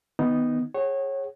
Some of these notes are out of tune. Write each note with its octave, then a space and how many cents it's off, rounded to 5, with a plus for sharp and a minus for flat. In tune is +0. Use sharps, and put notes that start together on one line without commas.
D#3 +0 B3 +0 D#4 +0
G#4 +0 C#5 -25 F#5 +30